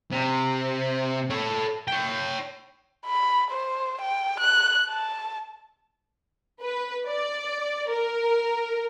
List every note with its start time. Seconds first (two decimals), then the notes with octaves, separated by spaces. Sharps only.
0.12 C3
1.30 A4 C#5
1.88 C#5 G5
3.06 B5
3.51 C5
4.01 G5
4.40 F#6
4.91 A5
6.60 B4
7.06 D5
7.89 A#4